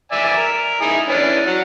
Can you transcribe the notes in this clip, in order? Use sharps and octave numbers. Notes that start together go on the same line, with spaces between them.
D5 E5 G#5
A#4
D#4 E4 G#4
E3 C#4 D4
F#3 F#5